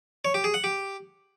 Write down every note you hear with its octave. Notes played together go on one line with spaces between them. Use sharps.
C#5
G4
G#4
F#5
G4